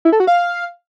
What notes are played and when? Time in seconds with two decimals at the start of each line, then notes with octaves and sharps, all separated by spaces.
0.05 E4
0.12 A4
0.20 F#4
0.27 F5